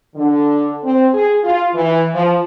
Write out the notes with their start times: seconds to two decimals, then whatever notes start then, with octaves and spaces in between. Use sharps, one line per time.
0.15 D3
0.83 C4
1.14 G#4
1.44 F4
1.74 E3
2.14 F3